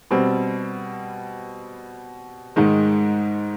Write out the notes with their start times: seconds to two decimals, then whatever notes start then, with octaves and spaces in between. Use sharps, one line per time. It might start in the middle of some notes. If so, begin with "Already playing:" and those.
0.11 B2 G3 C4
2.56 G#2 D#3 G#3